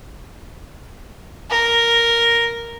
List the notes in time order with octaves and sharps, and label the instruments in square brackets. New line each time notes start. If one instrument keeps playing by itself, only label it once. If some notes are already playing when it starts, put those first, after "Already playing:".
[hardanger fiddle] A#4